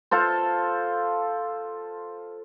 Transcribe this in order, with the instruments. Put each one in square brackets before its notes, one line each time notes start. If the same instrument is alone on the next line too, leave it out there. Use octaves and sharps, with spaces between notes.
[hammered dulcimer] F4 A4 C5